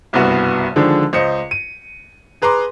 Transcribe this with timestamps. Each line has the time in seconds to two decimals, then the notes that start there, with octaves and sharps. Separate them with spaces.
0.13 F#1 C2 G2 B3 F#4
0.76 D3 D#3 F3 G#3 D4
1.13 C#2 C5 D#5 C#7
1.51 D#7
2.42 G#4 B4 A#5 C6 D6